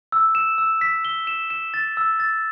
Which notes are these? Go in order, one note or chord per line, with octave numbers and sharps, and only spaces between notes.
E6
E7
E6
B6
G7
E7
E7
A6
E6
A6